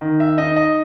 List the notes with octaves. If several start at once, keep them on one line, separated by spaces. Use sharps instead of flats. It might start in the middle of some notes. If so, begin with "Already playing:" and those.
D#3
E5
D#4 D#5
D#5